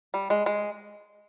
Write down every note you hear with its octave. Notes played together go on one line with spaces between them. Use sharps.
G3
G#3
G#3